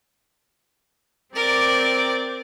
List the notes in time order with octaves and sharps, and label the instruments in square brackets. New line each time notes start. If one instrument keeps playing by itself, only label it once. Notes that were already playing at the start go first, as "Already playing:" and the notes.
[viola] C4 D5 [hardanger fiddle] A#4 D6